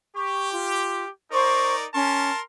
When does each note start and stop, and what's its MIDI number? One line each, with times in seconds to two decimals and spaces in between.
0.17 1.10 67
0.17 0.51 85
0.52 1.04 65
1.31 1.87 63
1.31 1.87 70
1.31 1.72 72
1.31 1.87 74
1.31 1.72 84
1.31 1.72 85
1.94 2.31 61
1.94 2.41 70
1.94 2.41 81
1.94 2.41 84